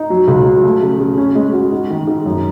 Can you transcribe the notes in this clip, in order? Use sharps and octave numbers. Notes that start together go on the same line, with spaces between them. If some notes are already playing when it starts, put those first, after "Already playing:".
Already playing: D#4
F#3
C#2
F#3
A3
C#3
C#3
C#4
G#3
F#4
G#2
D#3
G#2
F#2